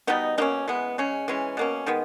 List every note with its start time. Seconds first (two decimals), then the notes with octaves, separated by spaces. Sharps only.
0.07 B2 G3 B3 D#4
0.38 B2 A#3 C#4 D#4
0.68 E3 G#3 B3
0.98 C#3 G#3 C#4
1.28 E3 G#3 C#4
1.57 B2 A#3 C#4
1.86 D#3 G#3 B3